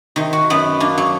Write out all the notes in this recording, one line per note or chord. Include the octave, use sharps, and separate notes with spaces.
C3 D#3
F#4
F#2 B3 B4
A#3 D4
F#3